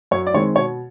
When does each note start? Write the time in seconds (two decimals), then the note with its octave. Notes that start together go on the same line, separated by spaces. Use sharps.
0.11 F#2 C#5
0.27 D5
0.34 D#3 G#3 C4 C#5
0.56 B2 C#5